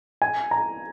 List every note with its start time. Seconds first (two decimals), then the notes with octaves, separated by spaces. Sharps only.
0.22 G#5
0.51 A#5